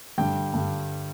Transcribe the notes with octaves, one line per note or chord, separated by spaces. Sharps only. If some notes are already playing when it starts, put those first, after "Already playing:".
G2 D3 G3 G5
G2 D3 G3